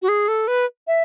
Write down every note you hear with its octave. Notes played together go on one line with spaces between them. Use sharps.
F#4
G#4
A4
B4
E5